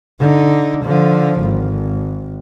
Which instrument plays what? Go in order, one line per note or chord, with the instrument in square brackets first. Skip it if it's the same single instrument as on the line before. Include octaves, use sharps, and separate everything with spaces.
[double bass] D3 D#4
D3 F3
G#1